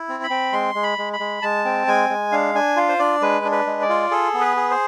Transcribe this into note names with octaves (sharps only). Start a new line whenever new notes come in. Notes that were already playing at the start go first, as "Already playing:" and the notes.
Already playing: E4
C4
B5
C4
G#3 C6
G#3
B5
G#3
B5
G#3
G#3 A5
C4
G#3 G#5
G#3
D4 F5
D4 G#5
F4 F5
C5
D4 D5
G#3 B4
D4
B4
G#3
D5
F4
G#4 A4
B3
B4
G#4
C5